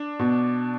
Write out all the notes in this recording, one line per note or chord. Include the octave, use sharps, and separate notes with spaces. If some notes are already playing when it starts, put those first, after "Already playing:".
Already playing: D4
B2